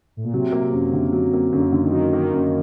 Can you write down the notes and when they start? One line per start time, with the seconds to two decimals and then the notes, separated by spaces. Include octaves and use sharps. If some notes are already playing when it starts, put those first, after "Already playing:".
0.17 A2
0.24 A#2
0.33 C3 F#3
0.52 A#3
0.73 F#2
0.93 D3
1.13 F#3
1.33 A#3
1.53 F#2 D3
1.72 D3
1.82 D#3
1.92 F#3
2.13 D#3 A#3
2.33 F#2